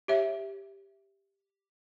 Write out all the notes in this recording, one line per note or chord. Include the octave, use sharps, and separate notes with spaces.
G4 C#5 E5